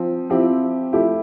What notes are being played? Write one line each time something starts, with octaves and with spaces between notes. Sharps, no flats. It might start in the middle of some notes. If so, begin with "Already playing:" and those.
Already playing: F3 C4
F3 C4 E4 G4
F3 A3 E4 G4